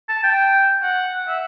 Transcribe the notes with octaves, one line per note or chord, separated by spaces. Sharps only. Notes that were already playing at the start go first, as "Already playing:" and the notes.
A5
G5
F#5
E5